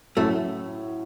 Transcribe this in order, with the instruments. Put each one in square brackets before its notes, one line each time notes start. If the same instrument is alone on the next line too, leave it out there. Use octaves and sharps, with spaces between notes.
[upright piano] A2 F#3 C#4 [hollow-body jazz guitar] A3